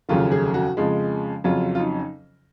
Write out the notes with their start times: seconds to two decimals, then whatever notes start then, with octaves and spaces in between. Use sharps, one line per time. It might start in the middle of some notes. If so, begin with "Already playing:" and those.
0.09 F1 D#2 C#3 F#3 F4
0.31 G#4
0.54 F#4
0.77 F2 C#3 F3 G#3
1.44 F2 C#3 F#3 F4
1.75 F4
1.79 D#4